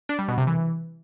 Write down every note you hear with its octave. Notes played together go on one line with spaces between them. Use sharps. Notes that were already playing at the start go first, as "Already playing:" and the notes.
D4
G3
B2
C3
E3